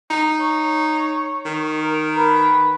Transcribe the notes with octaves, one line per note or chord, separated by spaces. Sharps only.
D#4
C#5
D#3
A#4
B4